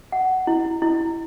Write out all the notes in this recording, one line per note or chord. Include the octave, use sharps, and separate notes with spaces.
F#5
E4
E4